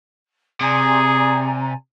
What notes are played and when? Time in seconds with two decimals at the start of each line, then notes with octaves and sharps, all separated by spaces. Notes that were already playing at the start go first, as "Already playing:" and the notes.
0.61 C3 G#4 D5 G#5 A#5